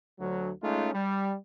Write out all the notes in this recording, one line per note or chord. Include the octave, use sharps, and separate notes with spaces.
D2 F#3
G#3 A3 C#4 D#4 F4
G3